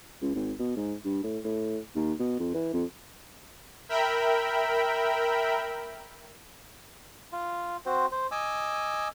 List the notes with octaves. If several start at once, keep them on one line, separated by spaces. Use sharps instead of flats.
C#2
G#1
B2
G#2
G2
A2
A2
D#2
B2
F2
E3
F2
A#4 E5 G5 B5
F4
C4 F#4 C5
C5
D#5 G#5 D6 E6